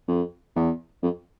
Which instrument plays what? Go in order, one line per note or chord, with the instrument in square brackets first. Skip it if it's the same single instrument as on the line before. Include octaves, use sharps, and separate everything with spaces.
[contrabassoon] F2
E2
F2